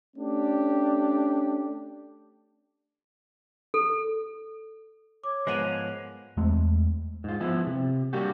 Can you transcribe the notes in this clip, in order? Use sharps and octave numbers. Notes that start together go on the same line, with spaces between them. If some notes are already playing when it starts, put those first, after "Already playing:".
A3 C#4 D4 G4
A4
C#5 D6
G#2 F3 G#3 B3 A#4 F#6 D#7 F7
E2 G#3 A3 C4
G#2 F4
F3 B3 E4
C3
G3 A#3 D4 F#4 G4